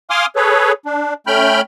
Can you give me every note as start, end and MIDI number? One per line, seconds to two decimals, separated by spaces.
0.10 0.26 77
0.10 0.26 80
0.10 0.26 84
0.10 0.26 86
0.10 0.26 87
0.10 0.26 89
0.36 0.72 68
0.36 0.72 69
0.36 0.72 71
0.36 0.72 73
0.86 1.14 62
1.27 1.61 57
1.27 1.61 61
1.27 1.61 79
1.27 1.61 83
1.27 1.61 89
1.27 1.61 91